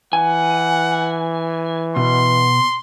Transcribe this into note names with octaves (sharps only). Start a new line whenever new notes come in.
E3 F#5 G#5
B2 C6